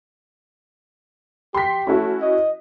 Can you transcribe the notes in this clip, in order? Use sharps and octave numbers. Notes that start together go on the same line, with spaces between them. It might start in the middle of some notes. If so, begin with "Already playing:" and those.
G4 C6 B6
A3 C#4 E4 F#4
D#5